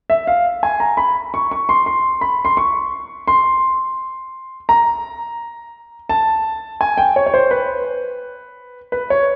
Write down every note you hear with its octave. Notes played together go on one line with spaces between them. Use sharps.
E5
F5
G#5
A#5
B5
C#6
C#6
C6
C6
B5
C6
C#6
C6
A#5
A5
G#5
G5
C#5
C#5
C5
B4
B4
C#5